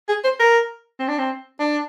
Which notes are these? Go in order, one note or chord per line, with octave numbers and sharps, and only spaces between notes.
G#4
C5
A#4
C4
D4
C4
D4